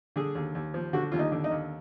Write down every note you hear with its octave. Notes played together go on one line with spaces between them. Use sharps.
D3 G#4
D#2
D#2
F3
D3 F#4
D#2 F4
D#4
D3
D#4
D#2